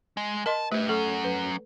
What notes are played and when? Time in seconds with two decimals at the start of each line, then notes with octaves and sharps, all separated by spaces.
0.17 G#3
0.46 A#4 D#5 A5 C6
0.72 A3 G4 B4
0.89 F#3 C#4 A4
1.24 B4